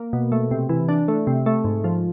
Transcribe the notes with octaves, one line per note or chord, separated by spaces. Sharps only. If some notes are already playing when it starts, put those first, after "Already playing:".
Already playing: A#3
B2
A3
C3
E3
D4
A3
C3
A3
G#2
F3